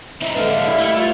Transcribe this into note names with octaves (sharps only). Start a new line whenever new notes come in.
C4 D#4 E4 E5
D3 G#3 A#3 D4 B4 D#5 F6
E5 F5
G3 E4
A3
F4 F7 G7